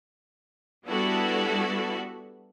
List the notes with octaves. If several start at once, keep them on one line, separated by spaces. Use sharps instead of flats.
G3 B3 D4 E4 F#4 A4